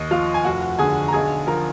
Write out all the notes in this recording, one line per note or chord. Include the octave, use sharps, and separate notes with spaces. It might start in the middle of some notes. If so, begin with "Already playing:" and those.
Already playing: D#2 D#5
F3 F4 F5
G#5
F1 F#4 F#5
D3 G#4 G#5
A#5
B1 G#4 G#5
F3 A#4 A#5